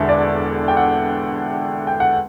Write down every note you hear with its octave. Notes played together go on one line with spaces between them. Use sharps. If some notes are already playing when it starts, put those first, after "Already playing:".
Already playing: E1 E2 D3 E5
D5
G5
F#5
G5
F#5